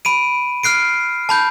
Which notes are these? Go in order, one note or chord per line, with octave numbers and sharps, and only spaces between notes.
B5 D7 D#7
F6 F#6 C7 D7
A5 B5 G6